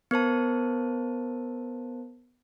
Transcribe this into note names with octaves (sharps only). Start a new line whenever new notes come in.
B3 A#4 C5 A5